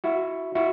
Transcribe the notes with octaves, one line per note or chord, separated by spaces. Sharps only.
E4 F#4
E4 F#4